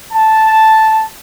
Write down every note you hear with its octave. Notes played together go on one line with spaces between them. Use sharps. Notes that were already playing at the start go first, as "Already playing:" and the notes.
A5